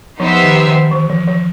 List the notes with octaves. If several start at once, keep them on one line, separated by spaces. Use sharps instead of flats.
F3 B3 D#4 G4 C5 E5
D#3
D#3
E3
F3
F3